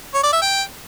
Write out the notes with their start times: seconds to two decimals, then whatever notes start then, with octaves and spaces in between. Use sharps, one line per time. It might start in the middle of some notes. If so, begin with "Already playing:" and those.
0.14 C#5
0.23 D5
0.33 E5
0.42 G5